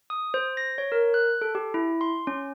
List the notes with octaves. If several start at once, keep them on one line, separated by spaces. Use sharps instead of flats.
D#6
C5
A#6
C#5
A#4
F#6
A4
G4
E4
C6
C#4